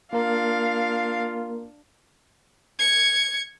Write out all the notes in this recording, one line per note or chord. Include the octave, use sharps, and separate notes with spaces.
A#3 D4 F4 A#4 F5
G#6 C#7